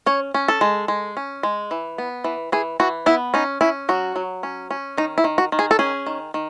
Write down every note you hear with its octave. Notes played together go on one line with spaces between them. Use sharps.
C#4 C#5
C#4
A4
G#3
G#3
C#4
G#3
E3
B3
E3
E3 G#4
E3 F#4
B3 E4
C#4 D#4
C#4 E4
F#3 F#4
F#3
C#4
C#4
D#3 D#4
E4
D#3
F#4
D#3
G#4
A4
C#4 G#4
D#3
D#3